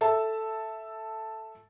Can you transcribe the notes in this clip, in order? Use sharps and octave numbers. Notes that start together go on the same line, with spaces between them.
A4 E5 A5